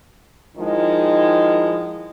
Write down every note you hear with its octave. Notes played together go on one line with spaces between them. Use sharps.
D#3 F3 G#3 D#4 E4